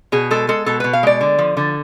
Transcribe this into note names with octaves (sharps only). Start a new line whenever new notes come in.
B2 G#4
G#3 A4
G#3 A4
B2 A4
B2 B4
F5
G#3 D5
D3
F3
D3